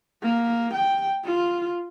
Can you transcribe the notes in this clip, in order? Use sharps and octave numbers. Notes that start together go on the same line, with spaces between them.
A#3
G5
F4